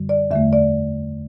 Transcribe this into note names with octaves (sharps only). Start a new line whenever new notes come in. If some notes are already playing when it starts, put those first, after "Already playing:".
Already playing: F#2 D3 G3
D5
E2 D3 A3 E5
D5